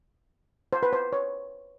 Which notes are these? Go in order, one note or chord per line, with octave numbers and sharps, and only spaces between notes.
C5
B4
C5
C#5